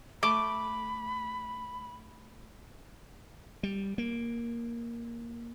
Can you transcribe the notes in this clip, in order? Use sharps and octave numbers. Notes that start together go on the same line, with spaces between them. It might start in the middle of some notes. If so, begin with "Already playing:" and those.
A3 B5 D6
G3
A#3